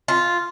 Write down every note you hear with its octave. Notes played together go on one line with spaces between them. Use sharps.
F4